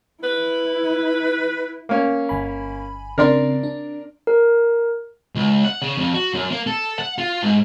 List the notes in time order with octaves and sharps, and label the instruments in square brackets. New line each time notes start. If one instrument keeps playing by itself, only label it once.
[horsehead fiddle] E4 [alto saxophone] B4
[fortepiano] A#3 C#4
[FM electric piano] G1 G#5 B5
[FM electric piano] C#3 C4 D4 [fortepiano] A#4 D5 C6
[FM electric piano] D4
[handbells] A#4
[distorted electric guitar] C#2
F#5
C#3
F2
F#4
F#2
A#3
A4
F#5
F4
G#2